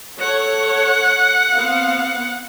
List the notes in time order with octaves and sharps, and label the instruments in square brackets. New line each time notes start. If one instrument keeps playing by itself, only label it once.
[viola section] A4 C#5 [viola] F#5
[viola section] B3 C4 F5